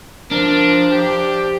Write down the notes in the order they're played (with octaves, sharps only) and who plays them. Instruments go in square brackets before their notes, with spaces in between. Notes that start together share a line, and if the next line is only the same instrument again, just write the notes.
[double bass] F3 [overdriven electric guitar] D4 [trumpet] A#4
[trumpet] G4